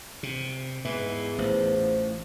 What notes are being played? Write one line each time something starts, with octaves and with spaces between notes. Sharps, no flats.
C3
E2 G#2 E3
A1 F3